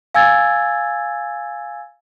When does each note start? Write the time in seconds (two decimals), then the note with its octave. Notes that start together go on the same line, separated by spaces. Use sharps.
0.15 F5 G#5 E6 G#6 A6